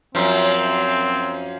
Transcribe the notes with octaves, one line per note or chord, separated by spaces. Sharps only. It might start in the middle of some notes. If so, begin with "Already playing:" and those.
F#2 F3 C4